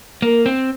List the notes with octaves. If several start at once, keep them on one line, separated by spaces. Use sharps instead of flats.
A#3 A#4
C4